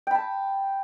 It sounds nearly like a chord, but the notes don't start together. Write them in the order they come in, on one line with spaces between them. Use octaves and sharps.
G5 B5 A5